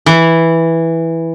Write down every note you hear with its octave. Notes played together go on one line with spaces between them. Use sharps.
E3